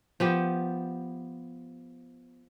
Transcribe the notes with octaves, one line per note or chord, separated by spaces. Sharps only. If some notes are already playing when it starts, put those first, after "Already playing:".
F3 B3 G4